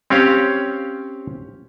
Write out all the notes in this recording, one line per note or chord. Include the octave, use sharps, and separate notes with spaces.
C4 C#4 G4 C#5 F5